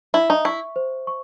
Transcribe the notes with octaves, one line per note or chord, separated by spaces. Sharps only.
E4 E5
D#4
E4 C#6
C5
C#6